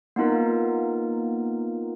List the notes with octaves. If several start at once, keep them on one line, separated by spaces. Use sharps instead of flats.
A#3 B3 D#4 F4 A#4